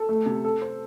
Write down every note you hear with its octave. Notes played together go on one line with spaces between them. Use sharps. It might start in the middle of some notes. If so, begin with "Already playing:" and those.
Already playing: A4
A3
C3
A4
C5